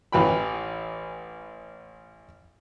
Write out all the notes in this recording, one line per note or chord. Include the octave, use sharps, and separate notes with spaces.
A1 E3 G5 B5